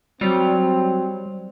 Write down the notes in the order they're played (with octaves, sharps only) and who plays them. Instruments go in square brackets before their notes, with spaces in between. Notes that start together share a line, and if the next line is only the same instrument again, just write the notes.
[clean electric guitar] F#3 [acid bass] G3 [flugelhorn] C4